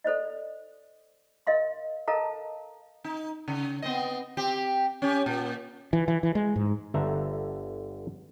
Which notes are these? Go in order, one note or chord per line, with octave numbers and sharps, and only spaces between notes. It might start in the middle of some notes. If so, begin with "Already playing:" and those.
A4 C5 D5 D#5
A#4 D#5 F5 C6
A4 A#4 D#5 F5 A5 A#5
D#4
C#3
B3 C4 D#5
C4 G4
C#4 G4
A#2
E3
E3
E3
G#3
G#2
G1 D3 E5 A#5